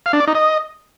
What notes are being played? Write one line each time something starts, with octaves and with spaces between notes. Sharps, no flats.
F5
D4
D5
D#4
D#5